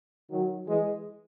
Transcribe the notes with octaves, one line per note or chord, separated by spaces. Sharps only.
D#3 F#3
E3 G#3